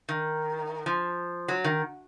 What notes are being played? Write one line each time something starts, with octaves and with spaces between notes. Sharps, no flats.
D#3
F3
F#3
D#3